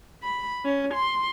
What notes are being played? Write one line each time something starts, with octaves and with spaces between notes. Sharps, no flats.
B5
C#4
C6